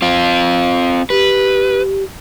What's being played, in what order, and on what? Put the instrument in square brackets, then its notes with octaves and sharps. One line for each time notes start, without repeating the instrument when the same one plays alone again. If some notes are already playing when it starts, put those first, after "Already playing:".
[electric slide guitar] C4 F4
[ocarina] G4 [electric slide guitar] B4